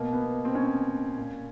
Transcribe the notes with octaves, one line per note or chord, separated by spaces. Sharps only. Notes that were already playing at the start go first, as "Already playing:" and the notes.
Already playing: B2 A#3
B3
C4
C#4
A#2